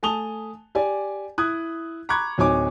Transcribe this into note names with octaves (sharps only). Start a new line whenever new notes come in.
A3 G#5 A5 D#6 F7 G7
G4 D5 G#5
E4 D#6 F#6 G#6
A#5 B5 C#6 D6 F#6 G#6
D1 F#3 D#4 C#5 G#5 D6